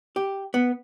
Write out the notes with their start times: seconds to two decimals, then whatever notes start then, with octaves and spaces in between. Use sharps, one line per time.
0.16 G4
0.54 B3